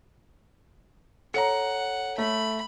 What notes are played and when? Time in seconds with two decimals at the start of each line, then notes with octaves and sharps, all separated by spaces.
1.34 A4 C#5 F#5 A#5 C#7
2.18 A3 B5